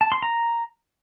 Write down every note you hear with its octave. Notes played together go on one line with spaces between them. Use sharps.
A5
C6
A#5